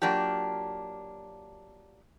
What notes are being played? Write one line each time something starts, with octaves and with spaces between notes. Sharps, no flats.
F#3 A#3 D4 F4 G4